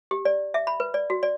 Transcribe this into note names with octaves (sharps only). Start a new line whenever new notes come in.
G4
D5
E5
B5
B4
D5
F#4
D5